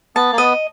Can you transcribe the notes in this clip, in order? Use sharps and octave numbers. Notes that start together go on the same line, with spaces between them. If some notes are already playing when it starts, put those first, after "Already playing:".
B3 A5
A#3
B3 D#5